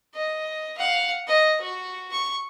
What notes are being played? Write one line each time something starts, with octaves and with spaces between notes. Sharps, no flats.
D#5
F5 F#5
D#5
F#4
C#6